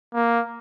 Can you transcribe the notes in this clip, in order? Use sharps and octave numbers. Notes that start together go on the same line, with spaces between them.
A#3